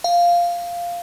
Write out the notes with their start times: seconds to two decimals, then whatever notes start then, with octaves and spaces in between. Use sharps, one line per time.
0.04 F5